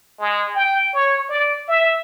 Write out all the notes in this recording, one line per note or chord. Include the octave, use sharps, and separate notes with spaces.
G#3
G5
C#5
D5
E5